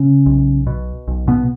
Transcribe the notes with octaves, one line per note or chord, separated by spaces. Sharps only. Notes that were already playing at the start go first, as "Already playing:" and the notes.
Already playing: C#3 C#4
B1
B2
B1
B2 B3